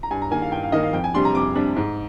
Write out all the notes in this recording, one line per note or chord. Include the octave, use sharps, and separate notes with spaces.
A#5
G2 G#5
A#5
D#3 A#3 G#5
F5
G2 G5
F5
D#3 A#3 D#5
F5
F2 G5
G#5
C3 G3 D4 C6
A#5
F2 D6
C3 G3 D4
G#2